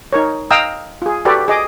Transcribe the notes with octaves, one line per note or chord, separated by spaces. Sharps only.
D#4 A#4 C#5
D#5 F5 G5 A#5 D#6 E6
F4 G#4
F#4 G4 A4 B4 D5
G#4 D#5 D6